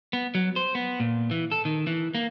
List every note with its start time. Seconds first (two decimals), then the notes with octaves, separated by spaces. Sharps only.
0.13 B3
0.35 F#3
0.56 C5
0.75 B3
1.00 A#2
1.31 E3
1.52 A4
1.65 D#3
1.87 E3
2.15 A#3